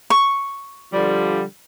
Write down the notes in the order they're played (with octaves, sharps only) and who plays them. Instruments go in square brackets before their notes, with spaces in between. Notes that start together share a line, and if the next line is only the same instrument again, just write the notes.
[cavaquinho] C#6
[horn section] D3 F3 G3